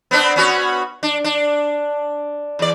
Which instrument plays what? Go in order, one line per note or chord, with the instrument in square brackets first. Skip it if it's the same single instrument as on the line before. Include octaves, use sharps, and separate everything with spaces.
[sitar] B3 C4 D4
B3 C#4 F#4
D4
D4
E2 D5